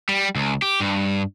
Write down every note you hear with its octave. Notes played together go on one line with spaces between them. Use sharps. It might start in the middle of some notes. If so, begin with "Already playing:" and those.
G3
C#2
G4
G2